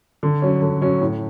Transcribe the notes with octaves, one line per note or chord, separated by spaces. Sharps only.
D3
F#3 C#4
D3
F#3 C#4
A2